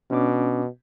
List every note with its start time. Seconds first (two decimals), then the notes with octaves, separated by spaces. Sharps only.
0.11 B2 C#4 D4 D6